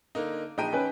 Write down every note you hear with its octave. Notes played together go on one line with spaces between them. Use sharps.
D3 A#3 D#4
A#1 D#4 G5 D#7
C#4 B4